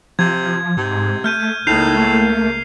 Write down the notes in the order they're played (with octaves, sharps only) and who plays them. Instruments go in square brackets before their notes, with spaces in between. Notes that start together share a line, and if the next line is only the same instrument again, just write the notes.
[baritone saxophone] C3 [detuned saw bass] F3 [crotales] G#6
[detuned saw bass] G#2 [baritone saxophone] C3
[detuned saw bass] A3 [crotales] F6 G6 D#7
[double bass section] C#2 A#3 [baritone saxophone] A2 [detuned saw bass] D#4 [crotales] G6 C7 F7
[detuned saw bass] A3